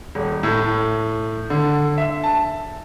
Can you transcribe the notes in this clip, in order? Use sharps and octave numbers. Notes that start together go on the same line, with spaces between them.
D#1
A2
D3
E5
A5